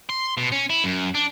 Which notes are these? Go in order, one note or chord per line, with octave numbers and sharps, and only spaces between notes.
C6
B2
C#4
E4
F#2
D4